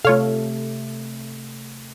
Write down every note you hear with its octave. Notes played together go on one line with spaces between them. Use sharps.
C3 A3 F4 A4 C#5 F5